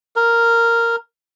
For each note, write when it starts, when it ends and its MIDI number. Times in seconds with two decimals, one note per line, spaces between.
0.16 0.96 70